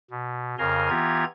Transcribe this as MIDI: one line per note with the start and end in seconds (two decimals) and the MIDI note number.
0.11 0.55 47
0.59 0.89 41
0.59 0.89 49
0.59 0.89 70
0.59 0.89 80
0.59 0.89 82
0.59 0.89 84
0.89 1.25 52
0.89 1.25 59
0.89 1.25 65
0.89 1.25 67
0.89 1.25 82
0.89 1.25 92